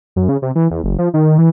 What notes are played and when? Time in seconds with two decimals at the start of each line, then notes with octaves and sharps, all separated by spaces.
0.16 F#2
0.29 C#3
0.42 C3
0.55 E3
0.70 E2
0.84 F#1
0.99 F3
1.14 D#3
1.38 E3